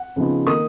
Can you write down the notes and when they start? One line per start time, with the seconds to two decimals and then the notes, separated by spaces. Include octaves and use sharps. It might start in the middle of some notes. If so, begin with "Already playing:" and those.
Already playing: F#5
0.16 C#3 F3 B3 D#4
0.47 D#3 A#3 D#4 D#6